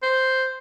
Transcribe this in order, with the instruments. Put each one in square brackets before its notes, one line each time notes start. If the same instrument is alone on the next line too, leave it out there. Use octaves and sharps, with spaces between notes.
[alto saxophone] C5